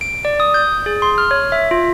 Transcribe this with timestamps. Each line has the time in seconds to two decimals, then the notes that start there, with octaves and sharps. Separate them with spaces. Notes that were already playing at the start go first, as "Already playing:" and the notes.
0.01 D7
0.25 D5
0.40 D#6
0.54 G6
0.86 G#4
1.02 C6
1.18 F6
1.31 C#5
1.52 E5
1.71 F4